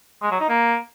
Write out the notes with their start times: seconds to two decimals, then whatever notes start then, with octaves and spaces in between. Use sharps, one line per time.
0.22 G#3
0.31 F#3
0.40 D#4
0.49 A#3